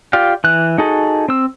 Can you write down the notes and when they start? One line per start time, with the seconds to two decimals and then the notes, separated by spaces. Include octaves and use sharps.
0.13 F4 G4 D5 F5
0.44 E3 F#6
0.78 D#4 F#4 G#4 A4
1.28 C4 E6